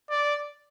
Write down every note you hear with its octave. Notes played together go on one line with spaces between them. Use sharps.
D5